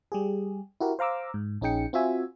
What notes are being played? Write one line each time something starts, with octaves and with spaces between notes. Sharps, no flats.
G3 G4 G#4
E4 F#4 G4 A#4
C5 F5 A#5 D6 E6
G#2
A#1 C#4 D#4 G#4 G5 C#7
C4 F4 F#4 E5 G#5